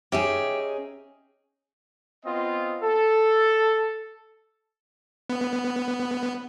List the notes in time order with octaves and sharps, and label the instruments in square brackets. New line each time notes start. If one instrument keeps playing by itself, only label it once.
[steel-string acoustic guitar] C#4 D#4 G#4 [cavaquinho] G4 E5
[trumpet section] B3 C4 F4 D#5
A4
[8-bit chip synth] B3